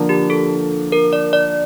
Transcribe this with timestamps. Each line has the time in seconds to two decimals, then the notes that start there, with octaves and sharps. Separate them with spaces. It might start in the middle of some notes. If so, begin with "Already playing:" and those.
Already playing: D3 F3 A#3 D4
0.09 G4
0.30 A4
0.92 A#4
1.13 D5
1.33 D5